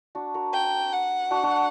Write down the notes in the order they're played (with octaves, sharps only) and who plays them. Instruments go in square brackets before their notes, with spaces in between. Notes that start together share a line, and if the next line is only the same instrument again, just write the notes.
[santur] D4 F#4
F#4 A#4
[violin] G5
F#5
[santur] D4 F#4
D4 F#4